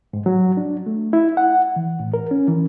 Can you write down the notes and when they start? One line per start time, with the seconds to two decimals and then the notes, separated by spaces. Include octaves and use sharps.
0.13 G#2
0.26 F#3
0.57 D4
0.86 A3
1.13 E4
1.37 F#5
1.76 E3
2.00 A2
2.14 A#4
2.31 C#4
2.48 E3